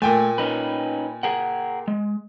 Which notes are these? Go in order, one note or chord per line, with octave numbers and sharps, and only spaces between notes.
A#2 A3 G5 G#5
C#4 D#4 B4
G#4 A#4 F#5
G#3